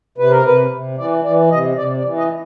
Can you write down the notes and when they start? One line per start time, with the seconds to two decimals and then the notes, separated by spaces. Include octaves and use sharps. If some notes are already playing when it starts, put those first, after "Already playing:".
0.18 C3 B4
0.31 A#4
0.45 C3 B4
0.71 C3
0.98 E3 D5
1.24 E3 D5
1.50 C3 D#5
1.77 C3 D5
1.97 D5
2.04 E3
2.17 D#5